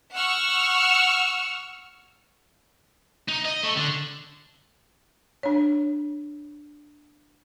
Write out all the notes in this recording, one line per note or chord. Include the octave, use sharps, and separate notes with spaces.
F#5 C#6 E6 F6
D#4
D#5
A3
D3
D4 C#5